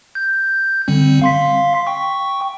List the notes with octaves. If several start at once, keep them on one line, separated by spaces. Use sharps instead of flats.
G6
D3 G3 C4
F5 C6 B6
G5 C#6